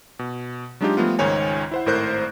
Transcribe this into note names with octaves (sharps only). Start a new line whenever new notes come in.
B2
F#3 G#3 D4 D#4 F4 G4
F3 G3 A3 B3 F4
C#2 G#2 D#3 C#5 G#5
E4 C5 F#5
G#1 A2 A#4 C5 F#6 G6